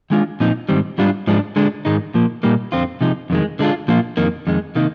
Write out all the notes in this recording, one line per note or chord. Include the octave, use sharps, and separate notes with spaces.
D#3 G#3 D4 F4
A#2 F3 C4 D#4
G#2 D#3 G3 C4
G#2 G3 D4 F4
G#2 F3 G#3 D4
D3 G#3 D4
G#2 D#3 G#3 D#4
A#2 F3 A#3
A#2 G3 A#3 D#4
F2 D3 F3 C4 F4
C3 F3 G#3 D#4
F2 D#3 G#3
D3 G#3 D4 F4
A#2 F3 A#3 F4
F2 D#3 A#3
F2 D#3 G#3
C3 D#3 A#3 D#4